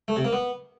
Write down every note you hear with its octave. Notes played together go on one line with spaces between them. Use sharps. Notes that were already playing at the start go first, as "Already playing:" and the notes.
A3
C3
A#3
B3